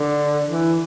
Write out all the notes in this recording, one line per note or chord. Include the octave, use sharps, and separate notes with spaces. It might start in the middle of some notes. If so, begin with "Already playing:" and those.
Already playing: D3
E3